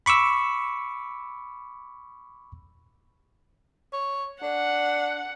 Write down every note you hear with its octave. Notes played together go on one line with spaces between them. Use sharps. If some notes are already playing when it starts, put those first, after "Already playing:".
B5 C#6 D6 E6
C#5
D4 F#5